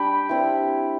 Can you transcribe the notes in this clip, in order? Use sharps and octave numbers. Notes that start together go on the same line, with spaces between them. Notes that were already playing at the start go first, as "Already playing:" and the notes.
Already playing: G3 D4 G5 B5
G3 C4 E4